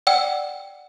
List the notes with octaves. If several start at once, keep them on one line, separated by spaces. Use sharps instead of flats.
D5 F#5 G5 E6